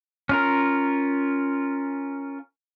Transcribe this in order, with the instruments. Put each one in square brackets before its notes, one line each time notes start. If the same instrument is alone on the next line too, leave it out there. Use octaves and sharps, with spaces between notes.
[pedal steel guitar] C#4 F4 A#4